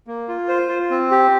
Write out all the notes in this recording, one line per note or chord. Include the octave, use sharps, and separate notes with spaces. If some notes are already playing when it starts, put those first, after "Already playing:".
A#3
F4
C5
F4
C4
G4